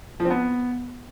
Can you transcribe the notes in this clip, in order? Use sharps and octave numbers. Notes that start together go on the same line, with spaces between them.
F3
C4
B3